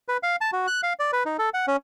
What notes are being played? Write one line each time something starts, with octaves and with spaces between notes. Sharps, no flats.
B4
F5
A5
F#4
F#6
F5
D5
B4
D#4
A4
F#5
C#4